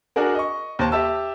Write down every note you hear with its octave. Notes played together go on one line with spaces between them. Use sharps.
D4 F#4 G#4 A#4
D#5 C#6
D#2 C5 A5
G4 E5 A5 E6